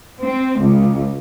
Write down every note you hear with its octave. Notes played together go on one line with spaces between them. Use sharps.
C4
C#2